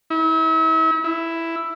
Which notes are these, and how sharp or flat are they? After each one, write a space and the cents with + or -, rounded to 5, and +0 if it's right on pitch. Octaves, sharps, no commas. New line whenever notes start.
E4 -40
E4 +5